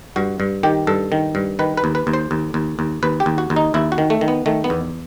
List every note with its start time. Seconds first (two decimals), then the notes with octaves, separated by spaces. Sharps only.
0.16 G2 F#4
0.40 G2
0.63 D#3 G4
0.87 G2 A4
1.12 D#3
1.35 G2
1.59 D#3 B4
1.77 B4
1.84 D#2
1.95 B4
2.07 D#2
2.13 C5
2.31 D#2
2.54 D#2
2.79 D#2
3.03 D#2 B4
3.20 G4
3.26 D#2
3.38 F#4
3.50 D#2
3.56 D#4
3.74 D#2 E4
3.92 F#4
3.98 D#3
4.10 A3
4.21 D#3
4.28 B3
4.46 D#3 A3
4.64 B3
4.70 E2